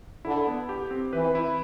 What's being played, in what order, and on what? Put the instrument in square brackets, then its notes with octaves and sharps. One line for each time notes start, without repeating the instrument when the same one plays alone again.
[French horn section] D3 [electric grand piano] E4
[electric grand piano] B3
G4
C4
[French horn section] E3 [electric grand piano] B4
[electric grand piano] E4